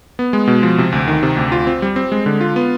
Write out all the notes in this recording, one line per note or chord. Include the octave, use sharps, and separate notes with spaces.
B3
G#3
B2
F3
C3
D2
D#3
C3
D2
F4
C4
G3
C4
G#3
D3
F4
B3